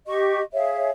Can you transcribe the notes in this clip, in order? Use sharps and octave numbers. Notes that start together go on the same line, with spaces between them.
G4 D#5 C#6
G#4 C#5 E5 F5